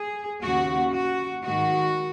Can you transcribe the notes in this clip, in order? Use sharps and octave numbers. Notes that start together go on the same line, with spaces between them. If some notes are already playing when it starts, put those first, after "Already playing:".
Already playing: G#4
D#2 C#3 A#3 F#4
F#4
G#2 D#3 G#3 F#4